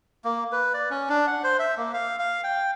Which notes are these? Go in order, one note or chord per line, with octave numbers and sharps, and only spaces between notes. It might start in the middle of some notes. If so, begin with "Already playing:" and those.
A#3
B4
D5
C#4
D4
F#5
C5
E5
A#3
F5
F5
G5